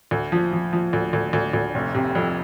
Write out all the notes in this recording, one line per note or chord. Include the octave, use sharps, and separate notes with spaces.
D2
F3
F3
F3
D2
D2
D2
D2
F1
C3
F2